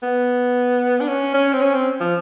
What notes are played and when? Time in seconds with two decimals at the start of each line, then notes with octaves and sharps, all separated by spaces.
0.03 B3
1.01 D4
1.08 C#4
1.34 C#4
1.53 C4
1.61 C#4
1.74 C4
2.01 F3